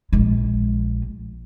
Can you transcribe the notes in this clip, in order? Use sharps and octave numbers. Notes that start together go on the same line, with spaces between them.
A#1 G#3